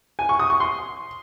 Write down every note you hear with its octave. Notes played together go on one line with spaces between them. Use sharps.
G#5
C#6
D#6
C#6
C6